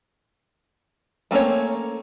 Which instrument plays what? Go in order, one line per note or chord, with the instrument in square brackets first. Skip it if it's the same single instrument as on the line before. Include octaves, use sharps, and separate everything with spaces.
[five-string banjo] A3 A#3 C4 C#4 C#5